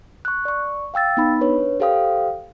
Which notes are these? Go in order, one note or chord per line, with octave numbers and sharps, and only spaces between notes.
C#6 F#6
D5 C#6
F5 G5 E6 A6
B3 D#4 B5
D4 B4 C#5
G4 A4 C5 F5 G5 D#6